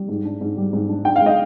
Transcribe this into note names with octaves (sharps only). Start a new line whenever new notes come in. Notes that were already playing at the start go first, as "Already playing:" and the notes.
Already playing: G3
G#2
D4
G#2
G3
G#2
D4
D4 G5
F5
G#3 D#5